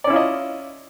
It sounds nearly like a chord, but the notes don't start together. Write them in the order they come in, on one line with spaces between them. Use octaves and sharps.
D5 C#4 E4 F4 D#5